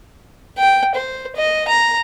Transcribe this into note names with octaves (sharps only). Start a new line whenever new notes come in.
G5
C5
D#5
A#5